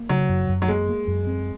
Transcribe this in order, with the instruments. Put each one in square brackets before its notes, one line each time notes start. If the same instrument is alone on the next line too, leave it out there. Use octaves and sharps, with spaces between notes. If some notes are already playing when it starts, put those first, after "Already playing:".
Already playing: [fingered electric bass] A#3
[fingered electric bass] C#3 [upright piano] F#3
[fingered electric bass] F#2
F#2
[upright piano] F#3
[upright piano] G#3 [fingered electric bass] A#3
[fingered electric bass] A#3
F#2
C4